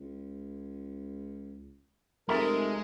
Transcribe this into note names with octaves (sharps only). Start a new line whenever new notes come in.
C#2
F1 G#3 A4 A#4 E5 A#5